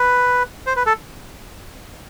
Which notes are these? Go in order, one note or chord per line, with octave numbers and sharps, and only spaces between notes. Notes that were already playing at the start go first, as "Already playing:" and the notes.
Already playing: B4
C5
B4
A4